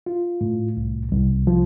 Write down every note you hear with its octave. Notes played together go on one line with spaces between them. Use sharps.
F4
A2
C2
C2
F3